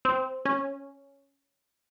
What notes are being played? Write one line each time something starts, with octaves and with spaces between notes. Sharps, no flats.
C4
C#4